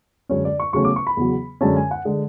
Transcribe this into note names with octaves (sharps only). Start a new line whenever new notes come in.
F#2 D3 G#3 C#4 C#5
D5
C#6
E2 C#3 F#3 A3 C#4 C#6
D6
C#6
B5
E2 C#3 F#3
F#2 D3 G#3 C#4 A5
G#5
F#5
D3 G#3